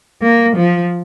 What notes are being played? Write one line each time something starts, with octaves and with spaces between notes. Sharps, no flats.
A#3
F3